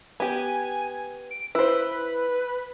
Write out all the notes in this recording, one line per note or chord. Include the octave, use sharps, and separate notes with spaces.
B3 G4 G#5
D7
E4 B4 C5